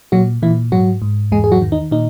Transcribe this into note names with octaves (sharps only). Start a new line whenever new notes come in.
A#2 F#3 F#4
A#2 E3 E4
G#2 F#3 F#4
G#2
E2 G#3 G#4
G#4
F#3 F#4
D#3
D#4
A#2 D#4